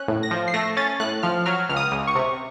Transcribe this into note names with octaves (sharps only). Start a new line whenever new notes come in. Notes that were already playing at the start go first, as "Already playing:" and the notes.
Already playing: C#4 F#6
A2
A#6
F3
C7
A3 A#6
C#4 A6
A2 F#6
F3 F6
F#3 F6
C#2 F6
D#6
C#2
C#6
C3